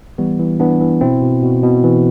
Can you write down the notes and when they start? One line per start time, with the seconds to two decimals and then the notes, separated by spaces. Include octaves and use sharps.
0.18 E3 G3 B3
0.39 E3
0.60 E3 B3 D4
0.81 E3
1.01 B2 C4 E4
1.21 B2
1.43 B2
1.63 B2
1.84 E3